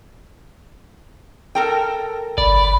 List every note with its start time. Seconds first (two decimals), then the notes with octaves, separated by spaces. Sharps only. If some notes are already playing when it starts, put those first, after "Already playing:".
1.55 A4 A#4 G5
2.38 G1 D5 B5